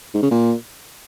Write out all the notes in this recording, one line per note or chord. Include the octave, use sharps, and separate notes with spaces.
G#2
C#3
A#2